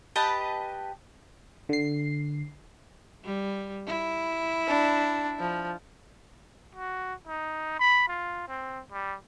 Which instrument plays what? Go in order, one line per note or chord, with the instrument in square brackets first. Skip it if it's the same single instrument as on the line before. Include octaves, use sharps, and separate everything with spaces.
[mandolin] G4 B4 D#5 A5
[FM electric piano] D3 C7
[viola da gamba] G3
E4
[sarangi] D4
F3
[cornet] F#4
D#4
B5
F4
C4
G3